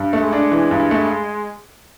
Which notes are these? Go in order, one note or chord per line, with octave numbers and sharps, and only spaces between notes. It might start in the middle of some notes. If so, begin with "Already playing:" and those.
Already playing: G2
A3
G#3
D4
E3
G2
A3